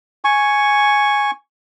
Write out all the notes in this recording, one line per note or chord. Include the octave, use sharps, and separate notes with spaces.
G#5 C#6